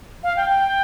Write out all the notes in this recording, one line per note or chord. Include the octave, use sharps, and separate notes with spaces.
F5
G5
G5